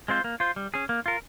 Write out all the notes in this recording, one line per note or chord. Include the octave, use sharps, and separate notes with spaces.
G#3 C4 F4 C5
A#3
F4 C5
G3
C#4 G#4
A#3
F4 A#4